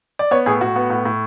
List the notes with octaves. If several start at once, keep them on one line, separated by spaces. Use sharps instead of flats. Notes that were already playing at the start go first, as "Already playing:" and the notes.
D5
B3 C#5
A2 G#4
A2 F#4
B3
A2
A2